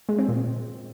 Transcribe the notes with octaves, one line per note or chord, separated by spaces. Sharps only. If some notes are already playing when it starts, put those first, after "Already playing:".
G#3
C4
A#2